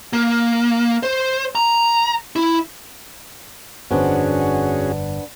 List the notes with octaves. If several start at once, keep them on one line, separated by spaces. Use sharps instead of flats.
A#3
C5
A#5
E4
G1 F2 B3 C#4 D4 F#4 G#4 C5